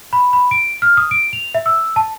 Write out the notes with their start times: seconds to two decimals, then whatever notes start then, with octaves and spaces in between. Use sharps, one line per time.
0.13 B5
0.33 B5
0.51 D7
0.82 F6
0.97 D#6
1.11 D7
1.33 F7
1.54 E5
1.66 E6
1.96 A5